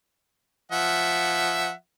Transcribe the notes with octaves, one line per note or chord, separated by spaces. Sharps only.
F3 E5 F#5